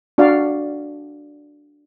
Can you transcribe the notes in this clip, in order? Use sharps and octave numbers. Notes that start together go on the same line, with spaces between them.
D4 F#4 D5 F5